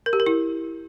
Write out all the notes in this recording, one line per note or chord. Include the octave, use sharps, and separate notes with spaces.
A#4
G4
A#4
E4